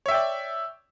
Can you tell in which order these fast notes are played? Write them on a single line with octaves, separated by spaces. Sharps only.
C#5 E5 G5 D5